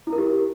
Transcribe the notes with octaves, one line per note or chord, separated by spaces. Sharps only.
E4
A#4
G4